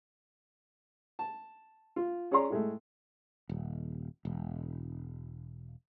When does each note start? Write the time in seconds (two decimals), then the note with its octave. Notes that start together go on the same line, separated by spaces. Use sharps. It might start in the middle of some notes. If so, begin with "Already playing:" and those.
1.19 A5
1.96 F4
2.31 C#4 G#4 C#5 D5 A#5 C6
2.50 A2 G#3 A3
3.49 D#1
4.25 E1